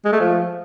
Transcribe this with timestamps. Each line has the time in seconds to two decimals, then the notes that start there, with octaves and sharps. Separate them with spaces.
0.05 G#3
0.12 A3
0.20 F3